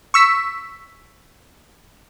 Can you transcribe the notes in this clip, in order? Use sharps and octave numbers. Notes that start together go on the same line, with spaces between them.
C#6 E6 B6